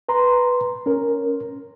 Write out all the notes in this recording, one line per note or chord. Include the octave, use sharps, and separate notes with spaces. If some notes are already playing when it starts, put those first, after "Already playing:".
B4 A#5 C6
C#4 A#4